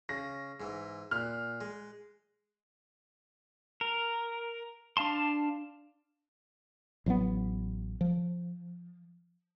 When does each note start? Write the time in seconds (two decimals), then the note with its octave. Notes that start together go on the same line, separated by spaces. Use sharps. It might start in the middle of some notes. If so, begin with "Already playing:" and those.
0.09 C#3 A#6
0.60 G#2 E3
1.11 A#2 F6 F#6
1.61 G#3
3.81 A#4
4.97 D4 F5 A5 C6
7.06 A1 F#3 A3 B3
8.01 F3